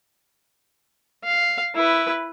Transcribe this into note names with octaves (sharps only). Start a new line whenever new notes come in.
F5
E4 B4